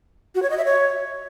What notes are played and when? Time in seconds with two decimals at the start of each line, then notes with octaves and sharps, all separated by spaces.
0.35 F#4
0.43 C#5
0.50 D#5
0.58 E5
0.65 C#5